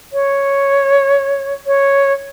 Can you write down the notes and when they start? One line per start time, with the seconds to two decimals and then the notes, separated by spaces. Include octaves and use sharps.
0.13 C#5
1.66 C#5